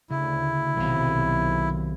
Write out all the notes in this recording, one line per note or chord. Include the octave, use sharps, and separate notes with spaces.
D2 C#3 E4
B1 C3 D#3 F5